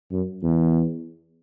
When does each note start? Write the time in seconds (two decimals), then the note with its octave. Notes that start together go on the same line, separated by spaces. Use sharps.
0.11 F#2
0.43 E2